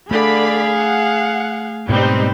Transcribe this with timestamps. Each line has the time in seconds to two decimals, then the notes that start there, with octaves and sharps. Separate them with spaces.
0.11 D3 A3 G#4 D5 F5 B5
0.78 F#5
1.89 G#2 B2 G3 A3 C4 D#4 B4 C5